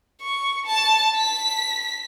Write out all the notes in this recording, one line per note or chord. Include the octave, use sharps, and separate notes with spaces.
C#6
A5
B6